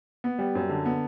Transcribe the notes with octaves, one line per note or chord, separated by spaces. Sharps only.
B3
G3
F#2
D3
B3